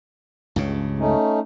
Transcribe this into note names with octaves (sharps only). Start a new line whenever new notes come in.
C#2 G2 C#3
A3 C#4 D#4